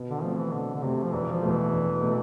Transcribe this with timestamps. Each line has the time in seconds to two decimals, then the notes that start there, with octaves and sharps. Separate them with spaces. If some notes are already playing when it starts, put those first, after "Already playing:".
Already playing: B2
0.09 D3
0.23 F3 A3 C4
0.38 E3
0.53 B2 D3
0.74 D3
0.82 C3 A3 C4
1.03 F3
1.13 E1 E3
1.32 F3
1.42 E2 B2 A3
1.52 E3
1.72 E1
2.02 B2 A3